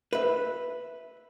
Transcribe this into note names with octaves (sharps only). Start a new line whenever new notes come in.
B4 E5